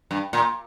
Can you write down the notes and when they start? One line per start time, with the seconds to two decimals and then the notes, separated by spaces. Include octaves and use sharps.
0.11 G2
0.33 A#2